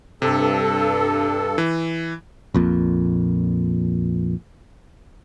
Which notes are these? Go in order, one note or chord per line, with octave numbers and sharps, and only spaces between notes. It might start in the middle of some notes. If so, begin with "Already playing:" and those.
G2 C3 A4
E3
A#1 F2 A#2